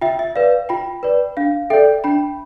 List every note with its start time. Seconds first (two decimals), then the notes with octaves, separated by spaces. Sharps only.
0.01 F4 E5 G5
0.19 E5
0.35 B4 D5 F5
0.69 F4 G5 B5
1.03 B4 D5
1.37 D4 F5
1.70 A4 D5 E5 G5
2.04 D4 G5 B5